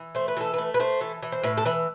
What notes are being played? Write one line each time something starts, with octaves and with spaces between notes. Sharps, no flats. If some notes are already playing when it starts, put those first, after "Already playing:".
Already playing: E3
A3 C5
B4
E3 A4
B4
A3
B4
A3 C5
E3
E3
C5
A2 B4
A4
E3 B4